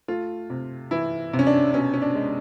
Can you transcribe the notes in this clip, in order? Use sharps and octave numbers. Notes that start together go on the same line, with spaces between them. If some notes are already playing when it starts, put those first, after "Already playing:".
A3 F4
C3
E3 E4
C3
C#4
D4
B2 C#4
C#4
D4
G#3